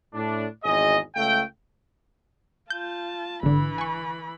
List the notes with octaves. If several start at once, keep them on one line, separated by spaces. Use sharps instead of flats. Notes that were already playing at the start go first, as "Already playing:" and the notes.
A2 D4
G#1 E2 G#4 D#5
C#2 A3 F5 G5
F4 A5 G6
G#1 D3 E3 B5
G#5 C#6